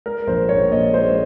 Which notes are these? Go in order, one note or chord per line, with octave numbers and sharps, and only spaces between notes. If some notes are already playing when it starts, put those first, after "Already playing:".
G#3 A#4
A#1 C5
A#1 C#5
A#2 D#5
G#3 C5